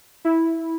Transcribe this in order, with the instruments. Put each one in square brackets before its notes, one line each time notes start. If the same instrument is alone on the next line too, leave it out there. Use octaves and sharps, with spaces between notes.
[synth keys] E4